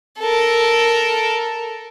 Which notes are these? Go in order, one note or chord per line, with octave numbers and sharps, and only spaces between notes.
A4 A#4